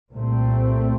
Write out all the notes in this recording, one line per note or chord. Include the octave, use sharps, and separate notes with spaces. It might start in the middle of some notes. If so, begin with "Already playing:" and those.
C2 A#2 A3 C4